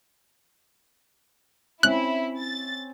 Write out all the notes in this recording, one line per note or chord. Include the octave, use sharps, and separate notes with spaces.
C4 C#4 E4 F#6
A6